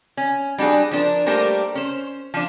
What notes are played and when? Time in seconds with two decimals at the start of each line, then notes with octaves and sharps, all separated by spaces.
0.17 C#4
0.58 G3 D4 F#4 G#4
0.91 F3 D4 A#4
1.26 G3 A3 A#3 G4 A#4 C5
1.75 C#4 C5
2.34 F3 D4